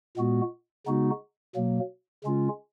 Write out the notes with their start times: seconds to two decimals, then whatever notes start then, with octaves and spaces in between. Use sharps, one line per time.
0.17 A#2 G#3 B3 F#4
0.86 C#3 G#3 B3 D#4 F#4
1.55 B2 F#3 A#3
2.24 C#3 G#3 C#4 F4